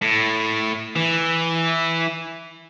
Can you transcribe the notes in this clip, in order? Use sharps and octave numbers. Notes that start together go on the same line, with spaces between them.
A2
E3